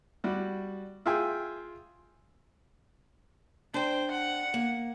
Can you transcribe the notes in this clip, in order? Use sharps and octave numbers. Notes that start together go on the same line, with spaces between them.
G3 F#4
F4 G#4 E5 G5 G#5
D4 C5 G5
F#5
A#3